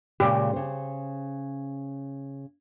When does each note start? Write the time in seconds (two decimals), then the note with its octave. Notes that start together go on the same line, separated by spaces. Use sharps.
0.20 A#2 C#3 G#3 G4
0.53 C#3 C5